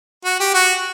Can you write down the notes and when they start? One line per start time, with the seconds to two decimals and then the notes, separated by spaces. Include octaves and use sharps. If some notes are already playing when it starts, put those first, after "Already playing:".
0.25 F#4
0.40 G4
0.54 F#4